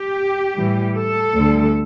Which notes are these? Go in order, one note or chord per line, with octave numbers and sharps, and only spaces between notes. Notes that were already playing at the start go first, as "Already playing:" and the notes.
Already playing: G4
A2 E3 G3
A4
D2 D3 G3